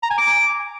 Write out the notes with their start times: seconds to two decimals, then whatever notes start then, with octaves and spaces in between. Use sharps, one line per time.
0.03 A#5
0.10 G#5
0.18 D6